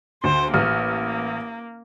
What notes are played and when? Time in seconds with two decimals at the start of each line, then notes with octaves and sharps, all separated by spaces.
0.24 D2 C5
0.54 A1 A#3 F6